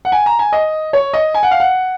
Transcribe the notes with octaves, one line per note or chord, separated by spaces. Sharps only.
F#5
G#5
A#5
G#5
D#5
C#5
D#5
G#5
F#5
F5
F#5